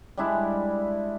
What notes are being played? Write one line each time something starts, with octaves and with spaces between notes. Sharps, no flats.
G3 G#3 D4 E4